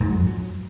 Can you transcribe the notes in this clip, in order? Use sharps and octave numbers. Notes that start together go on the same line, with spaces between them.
G#2
F#3
F2
F#3